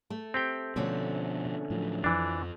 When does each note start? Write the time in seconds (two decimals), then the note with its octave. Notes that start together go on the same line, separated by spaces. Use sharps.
0.10 A3
0.34 C4 G4 G5
0.76 B2 D3 F3 A3 C#4
1.70 A2 F3 F#3
2.04 F2 E3 F3 D4